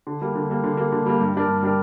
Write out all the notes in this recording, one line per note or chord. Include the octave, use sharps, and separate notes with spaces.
D3
G3 A#3
D3
G3 A#3
D3
G3 A#3
D3
G3 A#3
G2
G3 D4 A#4
G2
G3 D4 A#4